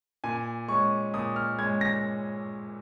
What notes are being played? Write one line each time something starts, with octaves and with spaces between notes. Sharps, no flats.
A#2 G#5
G#3 C#4 C#6
A#2 D#6
F6
G#3 C#4 G#6
A#6